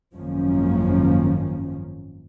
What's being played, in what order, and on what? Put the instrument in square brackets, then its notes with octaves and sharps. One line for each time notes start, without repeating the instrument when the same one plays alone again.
[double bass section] G#1 F#2 D#3 F3 A#3 C#4